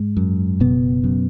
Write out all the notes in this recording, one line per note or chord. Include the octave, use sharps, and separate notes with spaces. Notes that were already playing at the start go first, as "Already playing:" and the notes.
Already playing: G#2 G#3
F#2
F#1 B2 B3
F#2